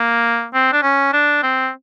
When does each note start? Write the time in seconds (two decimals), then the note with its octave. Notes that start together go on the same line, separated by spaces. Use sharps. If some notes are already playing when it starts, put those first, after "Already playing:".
Already playing: A#3
0.54 C4
0.72 D4
0.82 C#4
1.13 D4
1.43 C4